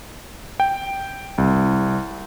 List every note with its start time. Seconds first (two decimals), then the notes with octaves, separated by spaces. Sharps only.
0.60 G5
1.38 C2